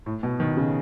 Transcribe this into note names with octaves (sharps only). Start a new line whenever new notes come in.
A2
B2
D#3
C#3